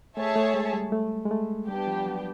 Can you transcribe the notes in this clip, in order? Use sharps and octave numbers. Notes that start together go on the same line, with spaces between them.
A3 G#4 C#5 E5 A5
A3
G#3
G3
A3
G#3
A3
G3 B3 D4 G4
F3
F#3